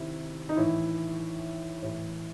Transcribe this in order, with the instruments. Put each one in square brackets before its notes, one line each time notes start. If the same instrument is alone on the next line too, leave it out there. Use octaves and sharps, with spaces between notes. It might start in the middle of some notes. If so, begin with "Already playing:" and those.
Already playing: [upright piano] C3 D#3 E4
D#4
A2 E3 E4
A2 E3